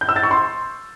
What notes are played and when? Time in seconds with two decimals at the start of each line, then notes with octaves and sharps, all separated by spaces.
0.01 G6
0.09 E6
0.16 A6
0.23 C#6
0.31 C6